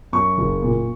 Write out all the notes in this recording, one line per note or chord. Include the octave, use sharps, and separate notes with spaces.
F#2 C#6
F#1
A#2